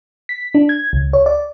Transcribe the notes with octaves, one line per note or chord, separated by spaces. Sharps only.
B6
D4
G#6
C#2
C#5
D5